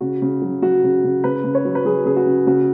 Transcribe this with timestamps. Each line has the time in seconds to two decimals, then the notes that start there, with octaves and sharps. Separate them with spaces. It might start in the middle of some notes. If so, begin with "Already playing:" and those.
0.01 C#3 F#4
0.22 C#3
0.42 F#3
0.62 F#3 F#4
0.84 C#3
1.04 C#3
1.24 C#3 B4
1.44 C#3
1.55 C#5
1.65 F#3
1.75 B4
1.85 F#3 G#4
2.05 C#3 G#4
2.16 F#4
2.26 C#3
2.47 C#3 F#4